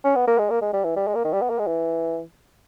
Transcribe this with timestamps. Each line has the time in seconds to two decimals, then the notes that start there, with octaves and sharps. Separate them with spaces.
0.04 C#4
0.15 B3
0.27 A#3
0.38 G#3
0.50 A#3
0.61 G#3
0.73 G3
0.84 E3
0.96 G3
1.07 G#3
1.15 A#3
1.24 D#3
1.33 G3
1.42 B3
1.50 A#3
1.59 G#3
1.67 E3